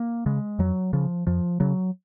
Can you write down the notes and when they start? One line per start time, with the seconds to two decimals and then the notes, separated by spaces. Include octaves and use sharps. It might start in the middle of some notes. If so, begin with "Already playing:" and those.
Already playing: A#3
0.26 C#3 G#3
0.59 F2 F#3
0.93 C#3 F3
1.27 F2 F3
1.60 C#3 F#3